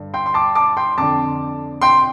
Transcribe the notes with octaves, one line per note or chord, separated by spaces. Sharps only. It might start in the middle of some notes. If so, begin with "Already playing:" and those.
Already playing: G2 D3
G5 C6
C6
A5 D6
A5 D6
G5 C6
F2 D3 A5 D6
G5 C6